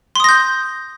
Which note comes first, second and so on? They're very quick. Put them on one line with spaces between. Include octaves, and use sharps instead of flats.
C6 D#6 A#6 G6